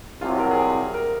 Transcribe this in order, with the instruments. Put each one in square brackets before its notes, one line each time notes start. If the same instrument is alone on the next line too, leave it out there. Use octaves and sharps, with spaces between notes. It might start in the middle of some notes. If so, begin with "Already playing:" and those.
[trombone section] C2 C3 F#3 [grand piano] F4
[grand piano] A#4
G#4
A#4
A#4